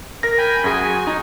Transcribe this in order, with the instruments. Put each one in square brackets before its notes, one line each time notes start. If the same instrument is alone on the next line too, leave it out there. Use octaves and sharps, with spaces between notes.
[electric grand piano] A#4 A#6
[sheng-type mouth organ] G5 G#5 B5
[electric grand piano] F#2 G#4 [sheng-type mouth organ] F#4 G#5
[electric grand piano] D#4